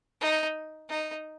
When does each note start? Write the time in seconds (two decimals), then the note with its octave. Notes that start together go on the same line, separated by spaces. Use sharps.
0.21 D#4
0.89 D#4